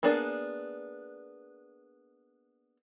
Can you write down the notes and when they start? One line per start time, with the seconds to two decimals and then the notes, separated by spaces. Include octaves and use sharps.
0.03 A#3 B3 D4 G#4 D5